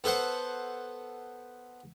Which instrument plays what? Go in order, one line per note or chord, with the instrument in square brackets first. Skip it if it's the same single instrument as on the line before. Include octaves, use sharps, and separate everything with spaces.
[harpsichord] B3 A4 C5 F#5